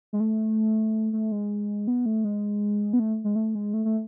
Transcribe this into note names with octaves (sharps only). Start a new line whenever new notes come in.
G#3
A3
A3
G#3
B3
A3
G#3
B3
A3
G#3
A3
G#3
A3
A3